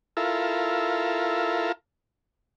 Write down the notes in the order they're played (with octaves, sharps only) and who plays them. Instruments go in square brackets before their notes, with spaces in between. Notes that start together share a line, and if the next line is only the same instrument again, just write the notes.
[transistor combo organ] E4 F4 A4 A#4